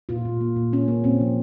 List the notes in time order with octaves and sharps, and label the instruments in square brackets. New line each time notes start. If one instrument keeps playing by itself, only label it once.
[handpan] A#2 F4
A#2
A#3
A#2
A#2 C#4
A#3
A#2 C4
F3